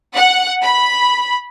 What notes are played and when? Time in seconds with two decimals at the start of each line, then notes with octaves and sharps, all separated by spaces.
0.16 F#5
0.62 B5